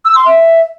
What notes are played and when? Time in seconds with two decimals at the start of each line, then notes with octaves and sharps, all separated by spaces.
0.05 E6
0.15 C6
0.25 E5